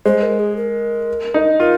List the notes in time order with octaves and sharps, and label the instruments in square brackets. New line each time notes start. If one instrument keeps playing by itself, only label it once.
[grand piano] G#3 [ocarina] C5
[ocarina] A#4
G#4
A#4
[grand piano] D#4
[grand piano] F4 [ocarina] A#4